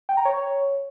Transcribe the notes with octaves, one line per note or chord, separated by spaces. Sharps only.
G5
A#5
C#5